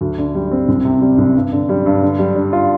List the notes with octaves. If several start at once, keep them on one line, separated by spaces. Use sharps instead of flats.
D2
D3
G3
C4
C2
C3
G3
C2
G2
D3
G3
G2
D3
G3
D4
F4